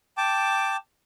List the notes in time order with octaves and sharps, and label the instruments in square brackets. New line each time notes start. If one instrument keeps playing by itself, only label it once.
[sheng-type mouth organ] G5 A5 D6